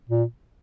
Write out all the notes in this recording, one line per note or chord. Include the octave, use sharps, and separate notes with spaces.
A#2